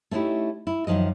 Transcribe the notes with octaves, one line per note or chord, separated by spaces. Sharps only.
A3 B3 C#4 D#4 E4 G4
E4
F#2 B2 D#3 F3 D#5